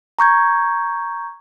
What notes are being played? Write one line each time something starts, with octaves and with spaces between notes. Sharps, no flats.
A#5 C#6 G6 G#6